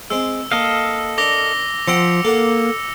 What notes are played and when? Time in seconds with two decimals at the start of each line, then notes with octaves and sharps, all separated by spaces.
0.10 G#3 C4 E6
0.52 A#3 A4 D#5 F5
1.18 D4 A#4 D6 A#6 G7
1.87 F3 C5 F#5 G5 E6 C#7
2.25 A#3 A4 A#4 F#5